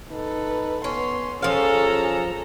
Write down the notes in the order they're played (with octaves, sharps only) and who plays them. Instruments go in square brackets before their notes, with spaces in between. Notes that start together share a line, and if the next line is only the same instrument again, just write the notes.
[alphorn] D#4 [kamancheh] A4 B4
[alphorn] B3 [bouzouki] C#4 [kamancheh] C6
[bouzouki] F3 F5 [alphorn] C#4 [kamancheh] G#4 A#5 [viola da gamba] A4